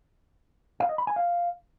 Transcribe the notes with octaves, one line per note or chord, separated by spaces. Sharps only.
F5
D#5
B5
G#5
F5